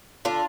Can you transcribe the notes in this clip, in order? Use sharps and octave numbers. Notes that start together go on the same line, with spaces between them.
D3 D4 F4